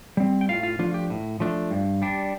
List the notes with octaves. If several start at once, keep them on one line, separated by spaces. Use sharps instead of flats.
G3 C4
G5
A2 F4 F5
F4 F5
F3 A3 D4 F4
G4
A2
F3 A3 D4
G2
G3 D4